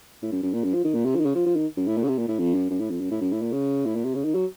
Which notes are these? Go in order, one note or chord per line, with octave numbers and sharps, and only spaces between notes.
A2
F#2
F#2
A#2
F#2
F3
D#3
A#2
C3
F3
D#3
C#3
F3
F3
D#3
F#2
A2
A#2
C#3
C3
A#2
A2
F2
F#2
F#2
A2
F2
F#2
A2
F#2
A2
A#2
C#3
A2
A#2
C3
C#3
D#3
F#3